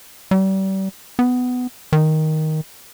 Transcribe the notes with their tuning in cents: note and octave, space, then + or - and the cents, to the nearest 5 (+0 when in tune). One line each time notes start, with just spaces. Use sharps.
G3 -35
B3 +15
D#3 +5